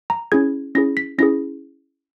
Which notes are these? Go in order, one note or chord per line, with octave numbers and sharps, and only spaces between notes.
A#5
C#4 E4 G#4 G#6
C#4 E4 G#4 A#6
B6
C#4 E4 G#4 A#6